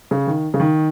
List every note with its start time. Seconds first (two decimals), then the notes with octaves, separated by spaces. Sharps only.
0.11 C#3
0.27 D#3
0.54 C#3
0.60 D#3